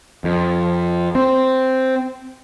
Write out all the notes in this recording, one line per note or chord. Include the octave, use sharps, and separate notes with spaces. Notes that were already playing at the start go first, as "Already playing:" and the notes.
F2
C4